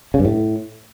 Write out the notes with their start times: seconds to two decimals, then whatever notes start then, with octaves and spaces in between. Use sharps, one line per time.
0.14 C#3
0.19 G2
0.25 A2